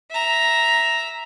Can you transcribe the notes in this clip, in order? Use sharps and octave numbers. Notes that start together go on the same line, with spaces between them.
E5 A#5